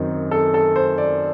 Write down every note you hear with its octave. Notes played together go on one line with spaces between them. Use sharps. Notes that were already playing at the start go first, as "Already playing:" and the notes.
Already playing: F#2 D#3 F#3 C4 D#4
A4
A4
C5
D5